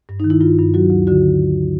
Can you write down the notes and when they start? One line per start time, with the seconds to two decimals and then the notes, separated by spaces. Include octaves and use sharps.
0.09 G2
0.20 D#3 D#4
0.30 E4
0.41 G2 F4
0.58 G2
0.74 F#3 F#4
0.90 D2
1.07 D3 F#4